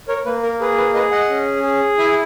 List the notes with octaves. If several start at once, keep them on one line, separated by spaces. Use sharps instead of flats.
A#4 C#5
A#3 B4
A#4
G#4 B4
B4
G#4 B4 D#5
D#5 F#5
C#4
G#4
E4 E5 G#5